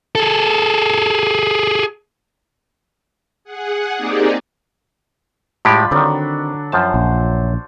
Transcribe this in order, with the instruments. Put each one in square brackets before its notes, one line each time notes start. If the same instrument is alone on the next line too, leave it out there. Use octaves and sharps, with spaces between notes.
[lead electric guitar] G#4 A4
[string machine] G#4 F#5
A#3 C4 D#4 G4 G#4 D5
[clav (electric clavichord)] A2 G#3 G4 [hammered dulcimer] G3 F4 B5
[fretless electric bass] D3 [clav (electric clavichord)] D#3 C4 [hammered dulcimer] F#3 D4
[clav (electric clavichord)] F#2 F3 A5 [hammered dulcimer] C5
[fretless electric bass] A#1